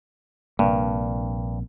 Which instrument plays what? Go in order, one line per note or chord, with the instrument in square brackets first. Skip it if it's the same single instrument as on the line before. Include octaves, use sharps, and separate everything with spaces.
[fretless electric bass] A#1 C3 A#3 [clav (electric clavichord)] G2